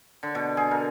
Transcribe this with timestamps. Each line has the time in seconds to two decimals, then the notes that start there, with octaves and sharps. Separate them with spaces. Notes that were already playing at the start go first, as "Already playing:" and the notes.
0.23 D3
0.35 B2
0.57 G#4
0.71 A#4